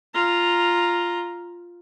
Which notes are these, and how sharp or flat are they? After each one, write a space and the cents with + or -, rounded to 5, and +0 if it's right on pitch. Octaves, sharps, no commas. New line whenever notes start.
F4 +0 A#5 +0